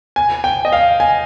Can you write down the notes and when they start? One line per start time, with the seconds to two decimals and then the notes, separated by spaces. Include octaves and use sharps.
0.16 G#5
0.44 G5
0.65 D#5
0.72 F5
1.00 G#5